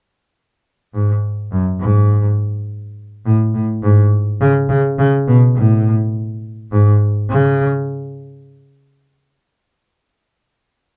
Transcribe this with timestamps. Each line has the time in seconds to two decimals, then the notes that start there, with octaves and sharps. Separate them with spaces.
0.94 G#2
1.52 F#2
1.80 G#2
3.26 A2
3.54 A2
3.83 G#2
4.41 C#3
4.69 C#3
4.98 C#3
5.28 B2
5.56 A2
6.72 G#2
7.30 C#3